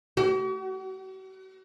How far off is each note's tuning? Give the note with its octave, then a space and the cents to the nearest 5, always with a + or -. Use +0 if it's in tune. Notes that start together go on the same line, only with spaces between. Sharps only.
F#4 +45